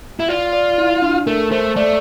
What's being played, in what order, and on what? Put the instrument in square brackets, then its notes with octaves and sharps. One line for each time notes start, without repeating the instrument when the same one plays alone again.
[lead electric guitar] E4
[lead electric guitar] F4 [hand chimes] D5
[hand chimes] D5
E4
D4
[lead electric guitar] A3 [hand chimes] A#4
[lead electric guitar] A3 [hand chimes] C5
[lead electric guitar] A3 [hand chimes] D5